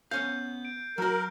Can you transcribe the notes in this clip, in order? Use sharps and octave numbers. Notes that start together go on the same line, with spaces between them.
B3 C#4 F5 G6 C7
D7
F#3 F#4 A#4